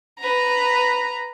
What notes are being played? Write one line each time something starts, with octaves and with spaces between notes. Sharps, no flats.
B4 A#5